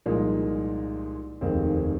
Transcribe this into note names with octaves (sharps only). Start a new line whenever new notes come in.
C2 A#2 F3 G#3 D#4
F1 D#2 D#3 G#3 C4